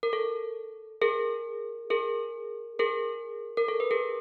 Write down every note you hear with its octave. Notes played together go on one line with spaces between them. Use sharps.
A#4
A4
G#4 A#4
G#4 A#4
G#4 A#4
A#4
A4
B4
G#4 A#4